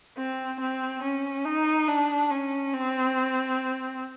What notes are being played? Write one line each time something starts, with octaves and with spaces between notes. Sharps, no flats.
C4
C4
C#4
D#4
D4
C#4
C4